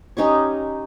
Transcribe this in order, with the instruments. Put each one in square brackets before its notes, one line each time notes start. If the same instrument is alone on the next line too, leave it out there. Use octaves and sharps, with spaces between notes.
[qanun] C#4 D#4 G4 C#5